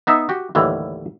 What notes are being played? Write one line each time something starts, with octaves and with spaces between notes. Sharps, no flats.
B3 D#4 E5
F#4 G4
D#2 A2 D3 E3 G3